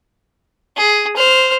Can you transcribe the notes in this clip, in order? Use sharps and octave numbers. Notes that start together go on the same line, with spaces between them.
G#4
C5 F6